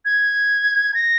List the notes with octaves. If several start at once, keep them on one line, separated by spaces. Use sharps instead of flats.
G#6
A#6